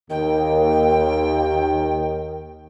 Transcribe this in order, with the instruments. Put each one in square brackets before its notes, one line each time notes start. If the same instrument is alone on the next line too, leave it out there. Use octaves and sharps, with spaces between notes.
[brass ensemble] D#2 [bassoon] D#3 [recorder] G5